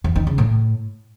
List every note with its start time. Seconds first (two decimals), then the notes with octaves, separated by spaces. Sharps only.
0.04 E2
0.16 D#3
0.27 C#3
0.38 A2